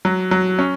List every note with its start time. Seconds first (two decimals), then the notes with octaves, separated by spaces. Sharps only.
0.05 F#3
0.31 F#3
0.59 C#4